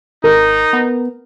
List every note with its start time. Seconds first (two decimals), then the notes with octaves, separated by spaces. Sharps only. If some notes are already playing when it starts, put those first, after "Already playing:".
0.24 G#1 D#4 A#4
0.73 B3